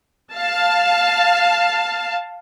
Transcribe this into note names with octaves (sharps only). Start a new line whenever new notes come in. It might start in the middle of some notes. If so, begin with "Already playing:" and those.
F5 A5